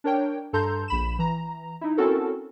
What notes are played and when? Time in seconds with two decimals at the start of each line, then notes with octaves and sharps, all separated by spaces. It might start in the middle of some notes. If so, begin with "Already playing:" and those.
0.04 D4 A#4 C#5 G5
0.53 G2 A4 A5 A#5 C6 G6
0.88 A#1 B5 E7
1.19 E3 A#5
1.81 D#4 E4
1.97 C4 C#4 E4 F#4 A4 A#4